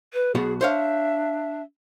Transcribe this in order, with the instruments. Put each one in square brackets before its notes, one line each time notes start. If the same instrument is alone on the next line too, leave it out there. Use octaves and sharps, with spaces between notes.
[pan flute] B4
[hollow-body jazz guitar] B1 B3 F#4 [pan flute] G#4
[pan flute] D4 [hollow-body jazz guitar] C5 C#5 F5 [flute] E5